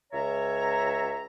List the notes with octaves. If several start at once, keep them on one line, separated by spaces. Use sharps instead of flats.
C#2 C#5 E5 A#5